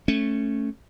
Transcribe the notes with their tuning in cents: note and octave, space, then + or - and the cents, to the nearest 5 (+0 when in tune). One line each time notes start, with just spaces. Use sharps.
A3 +0 C#4 -10